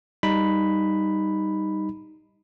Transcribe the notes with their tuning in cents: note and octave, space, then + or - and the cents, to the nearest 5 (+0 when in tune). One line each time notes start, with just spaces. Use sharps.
G3 +0 D#4 +0 B5 +5